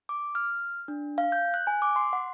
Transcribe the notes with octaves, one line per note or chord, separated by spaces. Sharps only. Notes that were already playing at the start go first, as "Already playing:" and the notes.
D6
F6
D4
F5
G6
F#6
G#5
D6
C6
F#5